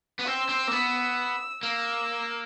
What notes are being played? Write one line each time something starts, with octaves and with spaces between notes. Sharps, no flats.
B3
C4 E6
C4
A#3
B3
A#3 E6